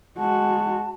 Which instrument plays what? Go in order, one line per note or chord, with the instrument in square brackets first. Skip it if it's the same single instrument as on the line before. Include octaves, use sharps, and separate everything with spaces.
[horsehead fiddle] G#3 F#4 [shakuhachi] A5